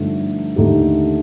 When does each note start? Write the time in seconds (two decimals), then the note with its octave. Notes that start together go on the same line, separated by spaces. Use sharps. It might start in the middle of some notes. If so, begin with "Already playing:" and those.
Already playing: G2 D3 F3 A3 D#4
0.56 D#2 D3 A3 D#4 G4